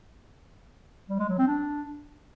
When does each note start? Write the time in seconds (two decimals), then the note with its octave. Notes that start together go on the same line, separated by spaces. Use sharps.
1.10 G3
1.19 G#3
1.29 F#3
1.38 C4
1.48 D4